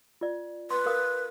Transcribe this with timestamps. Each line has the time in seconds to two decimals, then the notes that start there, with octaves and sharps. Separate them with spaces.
0.21 F4 D5
0.70 B4 C6
0.86 A#4 F5 D#6